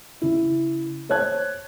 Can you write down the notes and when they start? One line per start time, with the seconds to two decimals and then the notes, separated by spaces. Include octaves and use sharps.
0.22 C#3 E4
1.09 C5 C#5 A5 F#6 G#6